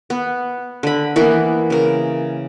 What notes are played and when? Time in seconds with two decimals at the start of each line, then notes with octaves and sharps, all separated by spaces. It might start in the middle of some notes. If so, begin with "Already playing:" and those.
0.10 B3
0.83 D3 B5
1.16 E3 A#3 B3 A#4
1.70 C#3 A#4